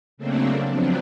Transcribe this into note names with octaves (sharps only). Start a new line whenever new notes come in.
C#3 F#3 A3 A#3 C4 D4
F3 F#3 B3 C4 D4